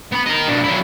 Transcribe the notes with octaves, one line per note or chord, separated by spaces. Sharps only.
B3 B5
A#4 D#5
B2 D4
F#3 E4